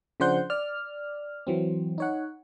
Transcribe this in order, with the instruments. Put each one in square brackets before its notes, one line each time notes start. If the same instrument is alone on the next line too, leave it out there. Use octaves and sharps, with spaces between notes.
[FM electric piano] C#3 F3 D4 C5 F#5 G6
D5 F6
E3 F#3 C4
D#4 C#5 F#5